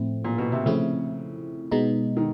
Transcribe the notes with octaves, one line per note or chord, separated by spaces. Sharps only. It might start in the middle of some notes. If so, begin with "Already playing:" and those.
Already playing: A2 F3 A3 C4 E4
A#2
B2
C3
C#3 F3 A3 C4 E4
B2 G#3 B3 D#4
D#3